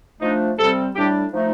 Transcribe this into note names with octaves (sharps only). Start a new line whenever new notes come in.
F3 A3 D4 D#4
C3 G3 C4 A4
A2 G3 D4 G4
F3 A3 D#4